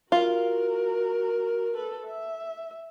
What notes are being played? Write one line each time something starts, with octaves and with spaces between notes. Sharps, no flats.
F4 F#4 A#4
A4 B4
E5